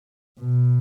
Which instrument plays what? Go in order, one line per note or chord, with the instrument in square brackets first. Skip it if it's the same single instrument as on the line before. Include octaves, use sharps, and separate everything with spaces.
[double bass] B2